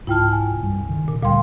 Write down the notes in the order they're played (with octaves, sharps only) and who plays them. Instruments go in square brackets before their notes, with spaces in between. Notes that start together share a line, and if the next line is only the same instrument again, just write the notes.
[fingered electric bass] C2 G#2 [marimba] E4 A5 [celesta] F4 G5 F6
[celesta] G#5
[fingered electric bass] C2 G2
C3 D#3
[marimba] A#2
[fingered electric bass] D2 G3 [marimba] A#2 C6 [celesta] F5 G5